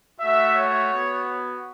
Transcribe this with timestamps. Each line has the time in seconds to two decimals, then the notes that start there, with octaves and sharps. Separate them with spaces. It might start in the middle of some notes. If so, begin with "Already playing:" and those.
0.20 A3 F#4 E5
0.56 C#5
0.91 B3 F#4